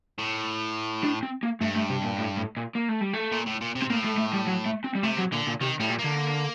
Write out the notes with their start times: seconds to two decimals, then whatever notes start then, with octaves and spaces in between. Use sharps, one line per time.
0.18 A2
1.04 D4
1.23 C4
1.43 A#3
1.61 G2 A3
1.76 A3
1.90 C3
2.04 A#2
2.18 A2
2.37 A2
2.57 A#2
2.75 A#3
2.89 A3
3.01 G3
3.13 A3
3.32 A#2
3.47 A2
3.61 A#2
3.75 C3
3.82 C4
3.89 A2 A#3
4.04 A3
4.18 A3
4.33 G3
4.47 F#3
4.66 A3
4.84 C4
4.95 G3
5.03 C3 A3
5.18 F#3
5.32 A#2 D3
5.47 A#2
5.61 C3 D#3
5.80 A2 G3
5.90 A#2
5.99 A#3
6.04 D3